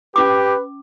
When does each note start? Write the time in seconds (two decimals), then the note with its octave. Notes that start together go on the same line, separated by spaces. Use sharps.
0.16 C#4 G4 B4 D6